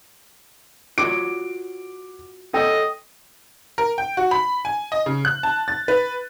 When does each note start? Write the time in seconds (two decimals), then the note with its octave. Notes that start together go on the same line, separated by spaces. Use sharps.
0.98 F4 F#4 C#5 D6 D7
2.54 A4 C#5 D#5 F#5 G5
3.78 A#4
3.98 G5
4.17 F#4
4.31 B5
4.65 G#5
4.92 D#5
5.06 C#3
5.25 F#6
5.43 A5
5.68 A6
5.88 B4